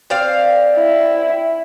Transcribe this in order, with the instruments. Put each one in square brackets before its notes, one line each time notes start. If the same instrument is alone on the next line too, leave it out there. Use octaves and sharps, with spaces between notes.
[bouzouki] C4 D5 F5
[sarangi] E4